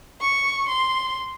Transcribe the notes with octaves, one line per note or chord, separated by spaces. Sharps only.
C#6
C6